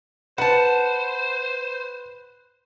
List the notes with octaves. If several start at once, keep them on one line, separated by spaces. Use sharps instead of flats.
B4 C5 F#5 A5